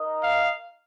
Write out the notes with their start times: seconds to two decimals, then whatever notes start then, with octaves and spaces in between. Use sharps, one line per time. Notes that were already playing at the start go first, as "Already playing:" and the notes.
Already playing: D#4 A#4 D#5
0.23 F5